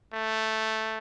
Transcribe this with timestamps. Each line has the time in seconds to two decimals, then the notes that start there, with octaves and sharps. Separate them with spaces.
0.13 A3